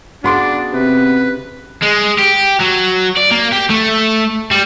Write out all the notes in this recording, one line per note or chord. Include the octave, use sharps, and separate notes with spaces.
C#3 B3 D4 F#4 C6 D6
C3 B4
G#3
G4
F#3
D5
A#3
G4
A3
G3